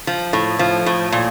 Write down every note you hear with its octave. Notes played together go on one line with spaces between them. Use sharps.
F3
A2
F3
A2
A#2